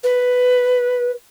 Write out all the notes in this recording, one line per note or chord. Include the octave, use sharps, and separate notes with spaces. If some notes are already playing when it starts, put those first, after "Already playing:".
B4